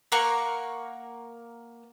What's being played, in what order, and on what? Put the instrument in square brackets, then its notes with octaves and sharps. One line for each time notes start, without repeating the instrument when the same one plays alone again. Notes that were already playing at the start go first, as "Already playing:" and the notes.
[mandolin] A#3 A#4 F#5 C#6